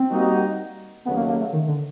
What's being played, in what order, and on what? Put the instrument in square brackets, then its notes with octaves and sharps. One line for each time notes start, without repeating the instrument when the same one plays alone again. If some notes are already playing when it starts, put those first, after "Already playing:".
Already playing: [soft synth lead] C4
[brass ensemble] G3 A#3 D#4 F#4
[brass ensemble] D#2 C#3 F#3 A3 [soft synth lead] B3
[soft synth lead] A#3
A#3
A3
D#3
D3